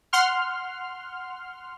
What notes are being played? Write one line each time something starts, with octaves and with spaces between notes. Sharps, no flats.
F#5 C6 F6